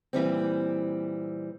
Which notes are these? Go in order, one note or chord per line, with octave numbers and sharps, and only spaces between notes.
A#2 E3 G3 C4